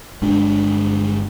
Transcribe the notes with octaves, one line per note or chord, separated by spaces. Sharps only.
G1 G#3 D4